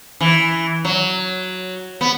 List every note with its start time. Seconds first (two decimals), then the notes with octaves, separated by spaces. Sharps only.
0.21 E3
0.85 F#3
2.01 B3